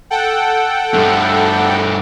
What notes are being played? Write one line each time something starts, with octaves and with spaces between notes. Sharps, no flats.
A4 F#5 G5
G2 A3